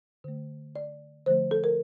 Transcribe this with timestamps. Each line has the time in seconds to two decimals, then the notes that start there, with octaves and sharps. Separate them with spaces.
0.24 D3 A3
0.76 D5
1.26 D3 F3 A3 C5
1.51 A4
1.64 A#4